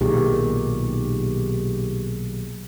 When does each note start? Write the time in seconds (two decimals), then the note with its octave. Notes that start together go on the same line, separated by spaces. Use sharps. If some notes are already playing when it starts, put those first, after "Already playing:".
0.01 B1 A#2 D#3 G4 G#4